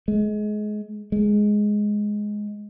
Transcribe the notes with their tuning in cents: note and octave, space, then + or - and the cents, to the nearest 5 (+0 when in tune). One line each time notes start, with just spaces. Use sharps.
G#3 +25
G#3 +5